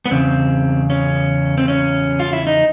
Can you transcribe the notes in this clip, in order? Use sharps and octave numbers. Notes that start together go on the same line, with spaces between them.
B3
E2 C#3 C4
C#4
C4
C#4
F4
E4
D#4